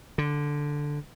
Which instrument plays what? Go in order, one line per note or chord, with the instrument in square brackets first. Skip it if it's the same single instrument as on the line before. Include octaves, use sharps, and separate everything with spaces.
[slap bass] D3